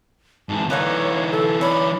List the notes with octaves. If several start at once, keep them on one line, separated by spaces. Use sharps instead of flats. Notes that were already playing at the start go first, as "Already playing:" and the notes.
G#2 E3 A5
D3 E3 A#3 D#4 B4 C#5
A4
C#4 D5 B5